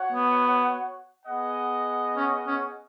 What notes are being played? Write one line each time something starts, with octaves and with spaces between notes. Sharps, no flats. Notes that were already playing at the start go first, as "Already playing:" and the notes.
Already playing: F#4 C#5 F#5
B3
B3 G#4 D#5 F#5
C#4
C#4